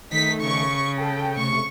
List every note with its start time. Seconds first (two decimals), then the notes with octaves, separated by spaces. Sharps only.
0.12 D#3 A3 D#4 B6
0.42 C#3 C#6
0.97 A4 G5
1.37 C3 A3 C#6